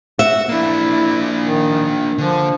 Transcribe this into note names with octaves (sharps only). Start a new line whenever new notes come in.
F#4 E5
A#3 D4 E4
D#3
D3 F3